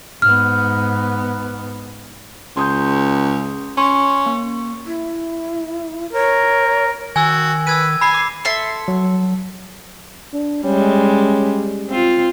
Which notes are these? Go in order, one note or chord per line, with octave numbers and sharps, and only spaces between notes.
G#2 B3 F6
C#2 C6 D#6 G6
C#4 C6
A#3
E4
A#4 C#5
D#3 F#4 G#5 E6 G#6
B4 E6 G#6 D#7
G#5 B5 C7
D6
A4 E5 C6
F#3
D4
G3 G#3 C#4
C4 F4